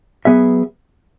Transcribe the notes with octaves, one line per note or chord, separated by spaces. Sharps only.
F#3 B3 G#4 E5